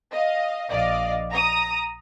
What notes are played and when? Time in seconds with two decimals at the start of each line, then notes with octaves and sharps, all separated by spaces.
0.12 D#5 F5
0.70 A#1 D5 D#5 F5
1.31 A#5 D#6